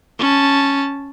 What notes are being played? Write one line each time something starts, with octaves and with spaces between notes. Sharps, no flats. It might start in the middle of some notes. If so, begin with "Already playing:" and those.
C#4 A5